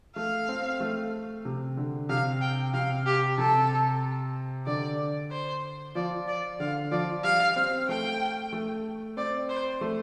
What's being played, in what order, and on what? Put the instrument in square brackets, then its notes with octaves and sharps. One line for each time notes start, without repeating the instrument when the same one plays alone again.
[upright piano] A3 [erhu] F5
[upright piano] C4
A3
C3
D3
[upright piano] C3 [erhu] F5
[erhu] G5
[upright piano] C3 [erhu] F5
[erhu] G4
[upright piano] C3 [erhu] A4
[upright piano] D3 [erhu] D5
[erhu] C5
[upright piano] F3 [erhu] D5
[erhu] D5
[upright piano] D3 [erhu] F5
[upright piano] F3 [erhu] D5
[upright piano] G3 [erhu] F5
[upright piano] C4
[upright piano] A3 [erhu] G5
[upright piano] A3
[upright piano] C4 [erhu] D5
[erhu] C5
[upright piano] A3